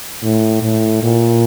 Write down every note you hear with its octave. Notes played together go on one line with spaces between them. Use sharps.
A2
A2
A#2